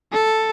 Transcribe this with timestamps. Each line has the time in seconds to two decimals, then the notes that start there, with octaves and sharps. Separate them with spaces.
0.13 A4